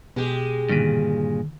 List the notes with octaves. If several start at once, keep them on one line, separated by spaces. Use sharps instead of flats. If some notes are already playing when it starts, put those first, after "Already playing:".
B2 G#3 G4
G2 A#2 D3 D#3